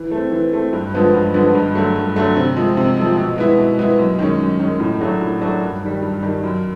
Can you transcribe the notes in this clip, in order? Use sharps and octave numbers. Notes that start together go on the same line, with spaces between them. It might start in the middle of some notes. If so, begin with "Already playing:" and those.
Already playing: E3
A3 C4
E3
A3 C4
G2
D3 F3 G#3 B3
G2
D3 F3 G#3 B3
G2
D3 F#3 A3
G2
D3 F#3 A3
C3
F3 G#3
C3
F3 G#3
B2
G#3 B3 E4
B2
G#3 B3 E4
F#2
D#3 G#3 C#4
F#2
D#3 G#3 C#4
A2
F#3 A3 D4 F#4
A2
F#3 A3 D4 F#4
G2
D#3 G3
G2
D#3 G3
F#2